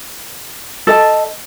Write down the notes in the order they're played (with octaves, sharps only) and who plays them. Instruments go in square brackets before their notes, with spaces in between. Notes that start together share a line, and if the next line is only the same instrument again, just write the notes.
[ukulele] A4 D#5 A5